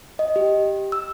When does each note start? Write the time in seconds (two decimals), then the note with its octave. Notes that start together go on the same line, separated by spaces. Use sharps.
0.19 D#5
0.36 G4
0.92 E6